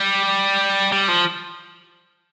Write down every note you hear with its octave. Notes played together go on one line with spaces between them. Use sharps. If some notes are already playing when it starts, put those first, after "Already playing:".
Already playing: G3
G3
F3